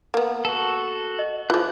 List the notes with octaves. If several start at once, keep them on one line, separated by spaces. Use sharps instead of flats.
A#3 B3
F#4 A4
D#5
E3 F3 F4 G#4 F#6 G6